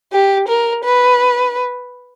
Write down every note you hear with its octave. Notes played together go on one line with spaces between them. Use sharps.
G4
A#4
B4